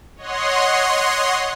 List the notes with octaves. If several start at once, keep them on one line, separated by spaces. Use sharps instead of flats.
C#5 D#5 F#5 C6